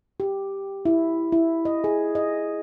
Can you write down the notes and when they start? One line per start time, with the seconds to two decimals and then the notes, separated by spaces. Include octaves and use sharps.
0.20 G4
0.85 E4
1.32 E4
1.65 D#5
1.84 G#4
2.15 D#5